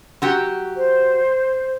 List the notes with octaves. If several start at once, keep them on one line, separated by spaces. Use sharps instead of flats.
F#3 F#4 G4
C5